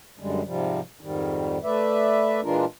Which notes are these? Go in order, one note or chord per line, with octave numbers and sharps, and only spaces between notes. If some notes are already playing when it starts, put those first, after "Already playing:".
F#2 D3 G3 G#3
G#2 C3 F3 G3
F2 G#2 D#3 G3
A3 B4 D5 E5
A#2 E3 G#3 D4 F4 A#4